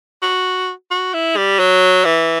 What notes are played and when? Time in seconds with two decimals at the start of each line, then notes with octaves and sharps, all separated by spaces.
0.22 F#4
0.91 F#4
1.13 E4
1.37 G3
1.59 F#3
2.05 E3